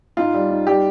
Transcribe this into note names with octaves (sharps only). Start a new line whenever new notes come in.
G#2 F4
G3
G#2
G3 G4